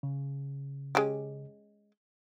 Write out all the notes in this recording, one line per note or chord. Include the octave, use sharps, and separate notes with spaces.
C#3
G#3 C#4 G4